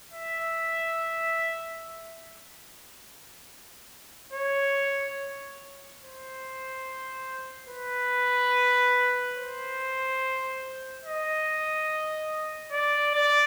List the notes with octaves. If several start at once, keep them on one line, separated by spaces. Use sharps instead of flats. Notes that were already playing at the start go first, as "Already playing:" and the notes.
E5
C#5
C5
B4
C5
D#5
D5
D5